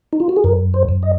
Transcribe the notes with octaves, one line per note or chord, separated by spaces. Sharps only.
D#4
F4
F#4
G#4
F#2 A#4
C5
F#2
D#5